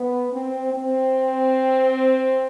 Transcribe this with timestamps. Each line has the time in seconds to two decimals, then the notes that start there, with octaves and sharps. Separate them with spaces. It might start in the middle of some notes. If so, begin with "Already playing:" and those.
Already playing: B3
0.32 C4
0.75 C4